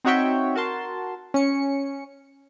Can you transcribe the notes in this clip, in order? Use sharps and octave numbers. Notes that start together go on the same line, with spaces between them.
C4 D#4 F#4 C#5 E5 G5
F#4 A#4 A5 C6
C#4 C#7